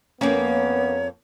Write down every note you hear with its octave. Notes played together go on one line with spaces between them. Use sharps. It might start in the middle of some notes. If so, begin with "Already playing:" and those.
F2 A#3 B3 C#4 C#5